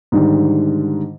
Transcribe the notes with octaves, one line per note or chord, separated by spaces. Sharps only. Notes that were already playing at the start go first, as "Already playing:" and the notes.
G#2 D3 D#3 G3